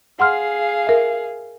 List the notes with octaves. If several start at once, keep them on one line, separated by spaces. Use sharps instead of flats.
G#4 F5 F#5 C6 F6
A#4 E5